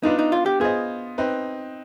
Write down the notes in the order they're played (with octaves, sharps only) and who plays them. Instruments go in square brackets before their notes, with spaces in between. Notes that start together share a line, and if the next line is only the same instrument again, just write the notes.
[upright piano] B3 D4 F4 B4 [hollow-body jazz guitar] D#4
[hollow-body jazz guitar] D#4
F4
G4
[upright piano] B3 F4 C5 D#5 [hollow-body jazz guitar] G#4
[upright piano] C4 D#4 B4